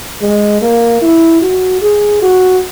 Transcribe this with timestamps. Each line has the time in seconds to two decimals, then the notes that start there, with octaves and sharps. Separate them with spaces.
0.21 G#3
0.62 A#3
1.02 E4
1.42 F#4
1.82 G#4
2.22 F#4